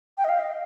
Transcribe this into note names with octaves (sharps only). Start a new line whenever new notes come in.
G5
D#5
F5
D#5